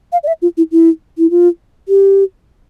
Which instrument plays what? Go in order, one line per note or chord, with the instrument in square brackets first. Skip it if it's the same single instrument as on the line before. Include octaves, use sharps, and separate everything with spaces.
[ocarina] F5
D5
E5
F4
E4
E4
E4
F4
G4